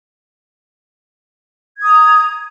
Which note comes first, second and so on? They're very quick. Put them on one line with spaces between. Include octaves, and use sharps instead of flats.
G#6 D#6 A#5